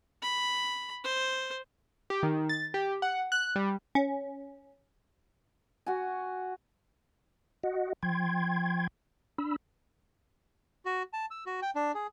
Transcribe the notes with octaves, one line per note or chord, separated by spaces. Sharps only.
B5
C5
G4
D#3
A6
G4
F#5
F#6
G3
C#4
F#4 G#5
F#4 D#5 F#5
F3 G5 C6 G#6
D4 B5 E6
F#4
A5
E6
F#4
G5
D4
G#4